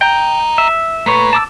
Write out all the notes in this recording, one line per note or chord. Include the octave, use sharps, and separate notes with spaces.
D#5 G5 A#5
E5
A#2 A3 B4 C#5
A5 D6 E6